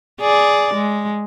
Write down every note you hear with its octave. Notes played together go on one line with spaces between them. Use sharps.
G#4 D5
G#3